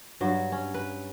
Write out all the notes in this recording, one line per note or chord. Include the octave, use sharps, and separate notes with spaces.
G2 F#3
C#4
B4